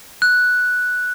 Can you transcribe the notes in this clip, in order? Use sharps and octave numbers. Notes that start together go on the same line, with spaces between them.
F#6